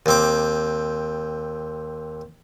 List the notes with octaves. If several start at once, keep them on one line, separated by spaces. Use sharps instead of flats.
D#2 C4 D6